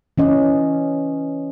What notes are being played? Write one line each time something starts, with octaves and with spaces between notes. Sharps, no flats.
E3 C#4 D#5